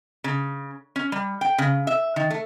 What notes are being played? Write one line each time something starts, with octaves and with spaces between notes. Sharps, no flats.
C#3
C#4
G3
G5
C#3
E5
D#3
A3